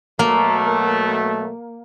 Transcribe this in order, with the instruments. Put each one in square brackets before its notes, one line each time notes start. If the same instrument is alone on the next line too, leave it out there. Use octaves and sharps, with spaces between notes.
[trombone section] B2 F#3 A3 [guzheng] A#3